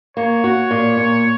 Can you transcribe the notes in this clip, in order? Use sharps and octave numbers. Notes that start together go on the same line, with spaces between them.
A#3 C#5
F#4
A#2
A#2